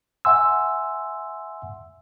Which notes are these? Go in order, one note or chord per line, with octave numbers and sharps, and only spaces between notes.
E5 F#5 G#5 C6 E6